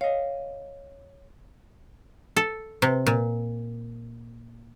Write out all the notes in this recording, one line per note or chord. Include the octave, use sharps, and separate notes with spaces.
C#5 D#5 F5
A4
C3
A#2